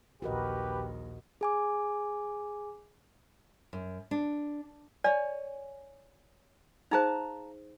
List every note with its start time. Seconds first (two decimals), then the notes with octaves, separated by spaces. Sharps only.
0.22 A#1 D#2 F#4 G4 A#4 B4 D#5
1.41 G#4 G#5 D6
3.73 F#2
4.11 D4
5.04 C#5 D5 G#5
6.91 D#4 G#4 C5 F5 A5 A#5